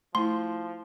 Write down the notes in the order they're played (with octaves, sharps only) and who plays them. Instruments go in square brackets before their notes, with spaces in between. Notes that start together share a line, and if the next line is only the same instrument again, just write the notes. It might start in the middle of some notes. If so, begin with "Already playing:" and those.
[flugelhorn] F3 [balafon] A3 E4 [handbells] C6